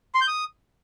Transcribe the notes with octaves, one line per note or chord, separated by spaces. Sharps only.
C6
G6
D#6